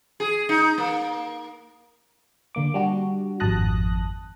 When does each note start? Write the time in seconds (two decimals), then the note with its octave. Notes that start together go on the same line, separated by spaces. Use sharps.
0.20 G#4
0.49 D#4
0.78 A#3
2.55 D3 A#3 D6
2.74 G3 D4 F#4
3.40 G#1 F2 A5 D#6 F#6 A#6